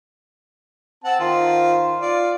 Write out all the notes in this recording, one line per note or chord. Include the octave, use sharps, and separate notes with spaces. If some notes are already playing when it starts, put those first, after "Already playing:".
C4 F#5 A5
D#3 F4 C5
F4 D5